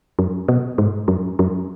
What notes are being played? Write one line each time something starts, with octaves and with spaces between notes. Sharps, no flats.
F#2
B2
G#2
F#2
F#2